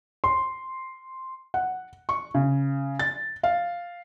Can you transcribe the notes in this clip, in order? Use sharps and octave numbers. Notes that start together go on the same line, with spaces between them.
C6
F#5
C#6
C#3
A6
F5